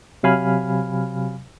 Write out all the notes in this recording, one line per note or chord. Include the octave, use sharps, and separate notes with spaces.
C3 F#3 F5 G#5 B5 F6